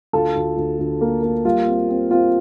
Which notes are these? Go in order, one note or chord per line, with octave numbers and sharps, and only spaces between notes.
D2 F4 A4
D2
D2
D2
A#3
A#3
G3 F4
C4
C4
C4 F4